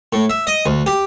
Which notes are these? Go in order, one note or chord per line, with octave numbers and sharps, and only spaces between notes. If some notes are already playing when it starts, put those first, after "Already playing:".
A2
E5
D#5
D2
G4